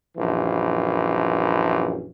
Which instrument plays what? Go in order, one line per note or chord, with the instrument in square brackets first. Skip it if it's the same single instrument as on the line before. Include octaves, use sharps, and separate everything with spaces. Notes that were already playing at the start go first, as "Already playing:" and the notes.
[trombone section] A#1 F#2 E3